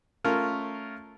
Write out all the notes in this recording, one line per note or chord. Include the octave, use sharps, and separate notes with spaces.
A3 C#4 F4 A#4